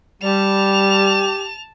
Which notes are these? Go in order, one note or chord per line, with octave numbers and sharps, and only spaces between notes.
G3 G4 A5 F7